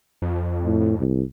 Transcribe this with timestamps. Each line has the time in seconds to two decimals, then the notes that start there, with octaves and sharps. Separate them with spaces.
0.22 F2
0.64 A2
0.98 C2